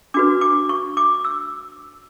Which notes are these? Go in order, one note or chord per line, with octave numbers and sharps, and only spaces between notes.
D4 F#4 B4 D6
D6
C#6
D6
E6